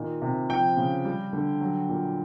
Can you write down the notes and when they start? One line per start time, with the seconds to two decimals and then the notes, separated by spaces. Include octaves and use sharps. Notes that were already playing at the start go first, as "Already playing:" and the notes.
Already playing: A#2 D#3
0.22 C3
0.50 F3 G5
0.77 C#3
1.05 G3
1.33 D3
1.61 F#3
1.89 A#2